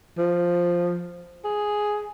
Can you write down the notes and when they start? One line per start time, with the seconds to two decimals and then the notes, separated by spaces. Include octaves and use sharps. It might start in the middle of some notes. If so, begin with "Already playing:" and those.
0.18 F3
1.44 G#4